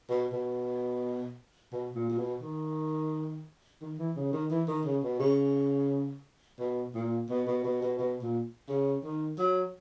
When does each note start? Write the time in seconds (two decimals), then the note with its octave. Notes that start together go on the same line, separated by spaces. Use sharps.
0.09 B2
0.32 B2
1.72 B2
1.95 A#2
2.09 A#2
2.18 B2
2.42 D#3
3.81 D#3
3.98 E3
4.16 C#3
4.33 D#3
4.50 E3
4.68 D#3
4.85 C#3
5.03 B2
5.20 C#3
6.60 B2
6.94 A#2
7.30 B2
7.47 B2
7.64 B2
7.82 B2
7.99 B2
8.22 A#2
8.68 C#3
9.04 D#3
9.38 F#3